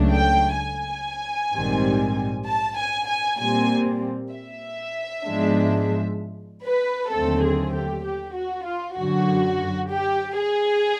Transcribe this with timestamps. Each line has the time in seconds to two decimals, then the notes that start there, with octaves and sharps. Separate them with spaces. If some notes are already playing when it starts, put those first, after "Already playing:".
Already playing: C#2 C#3 F#3 A3 D4
0.14 G5
0.61 G#5
1.53 A#1 G#2 D#3 G3 C4
2.47 A5
2.78 G#5
3.09 G#5
3.40 A#2 G3 C4 G#5
4.33 E5
5.26 G#2 F3 G#3 B3 D4
6.66 B4
7.12 D#2 D3 F#3 A3 C4 A4
7.44 G#4
7.74 G4
8.05 G4
8.36 F#4
8.67 F4
8.98 F#2 D3 F#3 F#4
9.92 G4
10.38 G#4